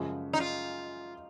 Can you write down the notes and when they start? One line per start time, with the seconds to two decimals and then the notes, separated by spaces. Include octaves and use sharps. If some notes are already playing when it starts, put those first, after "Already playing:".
Already playing: F#2 C#3 F3 G#3
0.33 D#4
0.40 F4